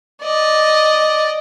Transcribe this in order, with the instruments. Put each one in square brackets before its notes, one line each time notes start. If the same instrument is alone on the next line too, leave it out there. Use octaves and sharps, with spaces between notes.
[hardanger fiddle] D5 D#5